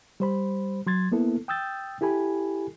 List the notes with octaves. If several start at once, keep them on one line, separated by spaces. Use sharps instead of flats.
G3 C5 B5
F#3 C6 G#6 A6
A#3 B3 E4 A4
G5 D#6 E6 G6 A6
E4 G4 A4 G#5 B5